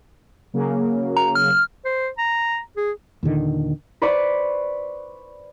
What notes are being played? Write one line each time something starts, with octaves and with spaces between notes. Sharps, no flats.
C#3 F#3 A#3
A#5
F6
C5
A#5
G#4
D#2 A#2 D3 D#3
B4 C5 D5 B5 C#6